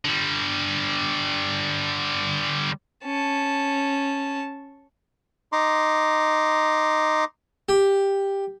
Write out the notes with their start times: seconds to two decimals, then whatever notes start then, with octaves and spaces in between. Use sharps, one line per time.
0.05 D3 G3
3.05 C#4 A5
5.52 D#4 A#5 C6 D6
7.69 G4